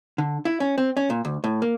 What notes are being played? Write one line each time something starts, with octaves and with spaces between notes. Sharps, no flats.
D3
E4
C#4
C4
C#4
A#2
D2
A2
A#3